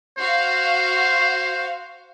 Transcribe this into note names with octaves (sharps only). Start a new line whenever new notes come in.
F#4 C5 F5